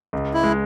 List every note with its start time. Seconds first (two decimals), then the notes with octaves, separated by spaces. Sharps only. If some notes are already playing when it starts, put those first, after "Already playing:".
0.13 C#2
0.34 E4
0.44 G#3